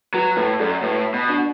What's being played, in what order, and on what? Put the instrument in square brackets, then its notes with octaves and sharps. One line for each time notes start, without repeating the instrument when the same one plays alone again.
[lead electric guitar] F#3 [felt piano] F#4 B4
[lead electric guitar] A2 [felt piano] F#4 B4
[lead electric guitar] F#2 [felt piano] A4 D5
[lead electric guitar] A2 [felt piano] F#4 B4
[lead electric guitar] B2
[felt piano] D4 F#4